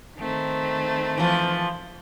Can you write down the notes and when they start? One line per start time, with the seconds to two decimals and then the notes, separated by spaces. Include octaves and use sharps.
0.18 D#3 A3 C4
1.17 E3 F3